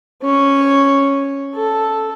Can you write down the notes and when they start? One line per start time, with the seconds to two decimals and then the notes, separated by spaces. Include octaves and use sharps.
0.22 C#4 C#5
1.55 A4